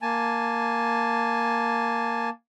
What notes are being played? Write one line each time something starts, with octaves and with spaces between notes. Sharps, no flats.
A#3 G#5 A5